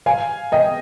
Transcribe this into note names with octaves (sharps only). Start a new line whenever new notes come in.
F5 G#5
D#5 G5